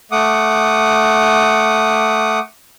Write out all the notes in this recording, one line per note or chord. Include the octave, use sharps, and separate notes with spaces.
A3 F#5 D6 D#6